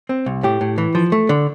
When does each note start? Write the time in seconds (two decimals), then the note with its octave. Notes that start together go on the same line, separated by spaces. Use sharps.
0.09 C4
0.26 C2
0.43 A2 G4
0.61 A2
0.78 E3
0.95 F3
1.12 A3
1.29 D3